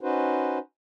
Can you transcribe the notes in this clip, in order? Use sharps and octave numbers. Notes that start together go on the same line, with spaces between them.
C#4 D#4 F#4 B4 C5